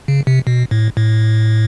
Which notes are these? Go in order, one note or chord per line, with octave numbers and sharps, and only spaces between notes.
C#3
C3
B2
A2
A2